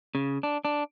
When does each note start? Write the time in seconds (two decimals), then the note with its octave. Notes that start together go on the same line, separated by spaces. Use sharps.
0.15 C#3
0.43 D4
0.65 D4